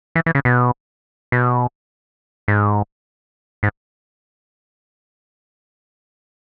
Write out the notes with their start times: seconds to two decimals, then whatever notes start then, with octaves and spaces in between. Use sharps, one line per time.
0.15 E3
0.26 E3
0.35 C#3
0.45 B2
1.32 B2
2.48 G#2
3.63 G#2